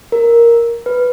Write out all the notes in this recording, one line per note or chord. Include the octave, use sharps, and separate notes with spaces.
A#4
B4